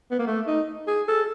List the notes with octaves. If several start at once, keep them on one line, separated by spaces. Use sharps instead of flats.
B3
A#3
A3
D#4
G#4
A4